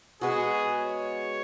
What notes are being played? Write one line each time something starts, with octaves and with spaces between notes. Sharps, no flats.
G#3 B3 F#4 G#4
C#5